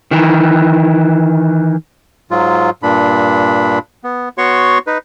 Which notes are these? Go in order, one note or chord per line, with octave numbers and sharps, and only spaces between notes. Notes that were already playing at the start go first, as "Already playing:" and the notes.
D#3 E3
G#2 F#3 F4
G2 A#2 D4 B5
B3
B3 F#4 C#5 C6 C#6
D#4 B4